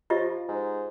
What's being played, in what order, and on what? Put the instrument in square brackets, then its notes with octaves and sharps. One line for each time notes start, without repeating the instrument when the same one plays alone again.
[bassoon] F3 [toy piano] F4 G4 D#5
[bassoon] G#2